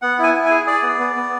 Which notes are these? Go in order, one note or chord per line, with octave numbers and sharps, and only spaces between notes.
B3 F#5
E4 G#5
E4
G#5
G#4
G#4 D5
B3
B3
B3